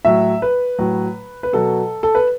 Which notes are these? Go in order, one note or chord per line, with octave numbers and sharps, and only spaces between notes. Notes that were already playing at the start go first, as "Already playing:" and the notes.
A2 F#3 E5
B4
A2 F#3
B4
B2 F#3 A4
A4
B4